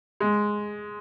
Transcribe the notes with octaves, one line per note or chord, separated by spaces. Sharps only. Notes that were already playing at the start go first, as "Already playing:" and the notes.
G#3